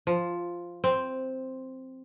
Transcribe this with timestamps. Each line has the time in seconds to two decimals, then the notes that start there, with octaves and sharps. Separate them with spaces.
0.07 F3
0.84 C4